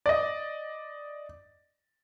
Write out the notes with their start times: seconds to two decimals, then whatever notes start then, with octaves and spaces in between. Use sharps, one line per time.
0.06 D5 D#5